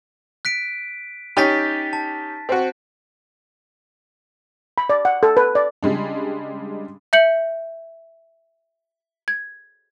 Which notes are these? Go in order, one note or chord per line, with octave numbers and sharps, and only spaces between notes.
F#6 B6 D7
C#4 D#4 G4 F#6 A6 B6
A5
C4 F#4
B5
D5
F#5
A4
B4
D5
C#3 G3 G#3 D4
E5 G6 C#7 F#7
G#6